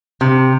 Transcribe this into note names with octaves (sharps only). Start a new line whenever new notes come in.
C3